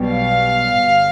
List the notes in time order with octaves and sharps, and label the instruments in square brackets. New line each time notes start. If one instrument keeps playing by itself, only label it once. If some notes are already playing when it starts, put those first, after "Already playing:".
Already playing: [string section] B1 B2 G3
F5
G1